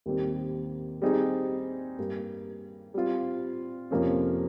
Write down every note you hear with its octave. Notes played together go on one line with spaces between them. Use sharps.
D#2 D#3 G3 C4 G4
G3 C4 D#4 G#4
G2 G3 A#3
G3 C4 F4
F2 C3 F3 A#3 C#4